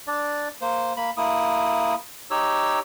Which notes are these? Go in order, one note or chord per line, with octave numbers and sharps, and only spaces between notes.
D4 D5
A#3 C5
A#3 B5
A#3 E4 D#6
D#4 G4 C#5 E6